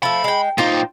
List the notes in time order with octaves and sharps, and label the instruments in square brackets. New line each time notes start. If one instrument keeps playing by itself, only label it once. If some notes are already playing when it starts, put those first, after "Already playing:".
[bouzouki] F3 A3 [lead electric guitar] B5
[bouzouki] G#3 G5
[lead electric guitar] A#2 D#4 [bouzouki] F4 C5 G5